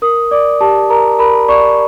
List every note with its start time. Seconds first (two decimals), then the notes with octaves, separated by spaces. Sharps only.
0.02 A#4 D#6
0.31 D5 D6
0.61 G4 A5
0.90 A#4 A#5
1.19 A#4 B5
1.48 D5 C#6